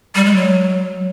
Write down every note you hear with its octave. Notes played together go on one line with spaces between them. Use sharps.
G3
G#3
F#3